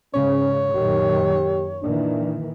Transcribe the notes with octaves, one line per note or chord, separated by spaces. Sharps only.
G#2 C#3 C#4 C#5
F#2 A#2 D#3 G4
A#2 D#3 E3 D4